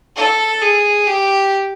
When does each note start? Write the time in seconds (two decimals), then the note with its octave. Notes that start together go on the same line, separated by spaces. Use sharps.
0.16 A4
0.62 G#4
1.07 G4